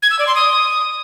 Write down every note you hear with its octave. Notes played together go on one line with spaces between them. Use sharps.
G#6
E6
D5
C6
D#6